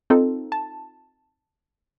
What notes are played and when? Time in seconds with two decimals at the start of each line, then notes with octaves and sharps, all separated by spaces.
0.10 C4 D#4 F4 A4
0.52 A5